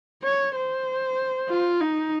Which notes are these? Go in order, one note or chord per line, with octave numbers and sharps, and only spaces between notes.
C#5
C5
F4
D#4